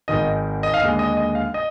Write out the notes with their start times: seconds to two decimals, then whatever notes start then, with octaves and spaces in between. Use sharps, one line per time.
0.08 G#1 G#2 D#3 D#5
0.63 D#5
0.74 F5
0.81 D#2 D3 G#3 D#5
0.99 D#5
1.17 D#5
1.35 F5
1.54 D#5